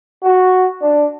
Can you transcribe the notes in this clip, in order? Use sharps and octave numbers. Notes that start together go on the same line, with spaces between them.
F#4
D4